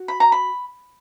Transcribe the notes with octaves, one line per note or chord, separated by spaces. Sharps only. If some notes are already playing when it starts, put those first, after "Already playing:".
Already playing: F#4
B5
A#5
B5